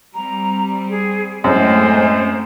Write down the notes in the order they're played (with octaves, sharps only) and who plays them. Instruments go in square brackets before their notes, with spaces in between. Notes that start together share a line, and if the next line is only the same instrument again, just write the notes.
[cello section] G3 C4 [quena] A#5
[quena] G#4
[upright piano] F#2 [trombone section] A2 G#3 [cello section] A3 C4 [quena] C5